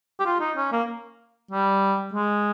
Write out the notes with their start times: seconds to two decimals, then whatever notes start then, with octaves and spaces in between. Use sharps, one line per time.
0.20 G4
0.26 F4
0.40 D#4
0.57 C#4
0.73 A#3
1.51 G3
2.14 G#3